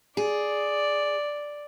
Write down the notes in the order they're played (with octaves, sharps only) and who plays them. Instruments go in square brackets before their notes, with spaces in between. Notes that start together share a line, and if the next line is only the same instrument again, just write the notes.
[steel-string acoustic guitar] G#4 [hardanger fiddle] D5